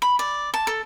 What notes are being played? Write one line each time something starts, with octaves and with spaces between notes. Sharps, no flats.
B5
D5
A5
A4